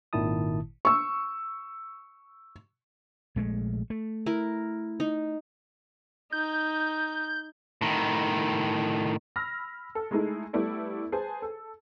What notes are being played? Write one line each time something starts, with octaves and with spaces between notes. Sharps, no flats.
G#1 A#2 D#3 E4 A5 D#6
C#6 E6
A#1 G#3 A3
A3
E4 A#4
D#4
D#4 G6
A2 D#3
B5 E6 F6 A#6
A4
G#3 A3 D#4 E4 G#4 A4
G3 A3 B3 E4 A4 D5
G#4 B4 C5 G#5 A5
A4